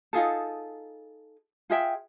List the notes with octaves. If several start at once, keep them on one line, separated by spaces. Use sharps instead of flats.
D#4 F4 G#4 A4
F4 G#4 E5 G5